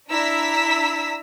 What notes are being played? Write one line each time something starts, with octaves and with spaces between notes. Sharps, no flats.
D4 E4 A#5 E6 B6